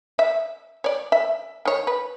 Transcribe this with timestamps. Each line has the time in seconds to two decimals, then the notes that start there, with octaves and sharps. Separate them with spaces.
0.19 E5
0.84 C#5 D5
1.12 E5
1.65 D#3 C#5
1.87 B4